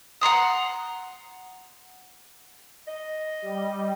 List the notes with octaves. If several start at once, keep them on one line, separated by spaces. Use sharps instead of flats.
F#5 A#5 C6 D#6
D#5
G3